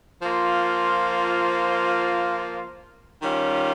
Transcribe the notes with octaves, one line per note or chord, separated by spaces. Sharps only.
F3 A#3 F4
D#3 G3 C#4 F4